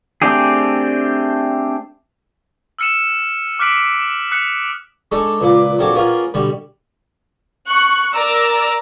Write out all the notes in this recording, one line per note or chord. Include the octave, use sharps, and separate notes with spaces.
A3 C4 D4 G4 G#4
E6 F6 C#7 D#7 E7
D6 F6 F#6 B6 D7 F#7
D#6 F#6 B6 C#7
G#3 D4 D#4 A4 C#6
C#2 A#2 B4 D6
A#1 F#3 C4 A4 C#5 D6
A#3 B3 C#4 F4 G#4 A#4
B2 D3 G3
C#6 F#6
A#4 D5 A#5 E6